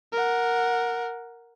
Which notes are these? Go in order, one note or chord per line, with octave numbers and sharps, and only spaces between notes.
A#4 F#5